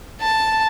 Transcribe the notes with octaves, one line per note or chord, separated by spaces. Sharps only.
A5